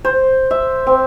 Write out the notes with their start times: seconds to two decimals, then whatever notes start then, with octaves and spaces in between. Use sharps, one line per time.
0.05 C5
0.51 E5
0.87 C4